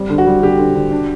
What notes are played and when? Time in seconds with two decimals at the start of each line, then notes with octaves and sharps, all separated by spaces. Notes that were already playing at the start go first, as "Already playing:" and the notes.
Already playing: G3 C4
0.10 D3
0.18 F#4
0.27 G3
0.42 D3 G4
0.58 D3
0.75 D3
0.91 D4